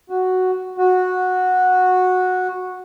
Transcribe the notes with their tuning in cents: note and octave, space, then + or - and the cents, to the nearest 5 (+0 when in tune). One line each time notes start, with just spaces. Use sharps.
F#4 +0
F#4 -10